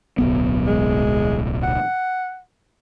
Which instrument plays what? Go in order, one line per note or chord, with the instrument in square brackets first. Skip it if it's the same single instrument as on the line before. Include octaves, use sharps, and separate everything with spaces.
[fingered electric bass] D1 B1 B3
[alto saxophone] G#3
F#5